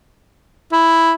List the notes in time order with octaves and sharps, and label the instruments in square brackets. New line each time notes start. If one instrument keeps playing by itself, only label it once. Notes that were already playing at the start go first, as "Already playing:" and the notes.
[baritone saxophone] E4